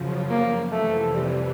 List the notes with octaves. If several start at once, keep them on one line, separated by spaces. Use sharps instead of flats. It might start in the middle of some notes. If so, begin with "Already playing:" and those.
Already playing: F#2 C#3 F3
A#3
F2 C3 E3 A3
G3